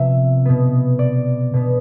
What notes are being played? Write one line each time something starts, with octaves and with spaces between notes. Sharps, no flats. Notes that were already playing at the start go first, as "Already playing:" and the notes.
Already playing: C3 F3 B3 E5
B2 B3
D5
B2 B3